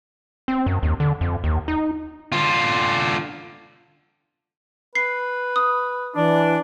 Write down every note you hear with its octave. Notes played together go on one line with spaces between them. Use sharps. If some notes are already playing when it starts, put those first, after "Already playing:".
C4
F#2
D#2
D3
F2
D#2
D#4
D3 F4
B4 C7
D#6
E3 D4